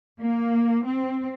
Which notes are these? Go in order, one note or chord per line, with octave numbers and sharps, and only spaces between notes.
A#3
C4